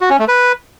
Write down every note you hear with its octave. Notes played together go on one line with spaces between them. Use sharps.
F#4
C#4
A3
B4